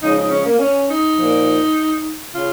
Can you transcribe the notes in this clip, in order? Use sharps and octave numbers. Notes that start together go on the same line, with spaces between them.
C#3 F3 G#3 D#4
D#4
C#4
A#3
C#4
D#4
A#2 F3 A#3
C#3 F4